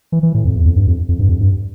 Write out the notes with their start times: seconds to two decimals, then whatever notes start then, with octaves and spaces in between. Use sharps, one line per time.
0.12 E3
0.23 E3
0.34 A2
0.45 F2
0.55 E2
0.65 F2
0.76 G2
0.87 F2
1.09 F2
1.19 G2
1.29 F2
1.41 G2